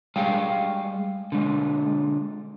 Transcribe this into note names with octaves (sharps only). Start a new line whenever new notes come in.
G3 G#3 F5 G5
D3 G#3